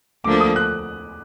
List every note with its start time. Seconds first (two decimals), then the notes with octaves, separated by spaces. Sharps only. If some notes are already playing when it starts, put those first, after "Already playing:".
0.24 D2 D3 F3 A#3 D4 D6
0.40 D#6
0.56 F#6